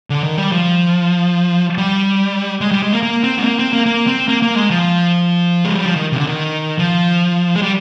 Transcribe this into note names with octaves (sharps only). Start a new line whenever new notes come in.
D3
D#3
G3
F3
G3
G#3
G3
G#3
A#3
A#3
C4
G#3
A#3
C4
A#3
A#3
C4
A#3
A#3
G#3
F3
G#3
G3
F3
D#3
C3
D3
D#3
F3
G#3
G3